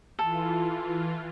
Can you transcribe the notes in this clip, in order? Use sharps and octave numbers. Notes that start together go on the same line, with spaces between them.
E3 F4 A4